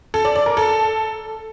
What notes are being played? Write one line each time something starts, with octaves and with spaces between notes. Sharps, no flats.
A4
D5
D5
A#4
A4